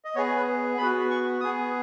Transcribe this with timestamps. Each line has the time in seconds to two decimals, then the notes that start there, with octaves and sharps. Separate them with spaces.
0.05 D#5
0.15 B3 C#5
0.18 G#4
0.36 B4
0.78 B3 F#4 B5
1.10 C#6
1.41 B3 G#4 D#6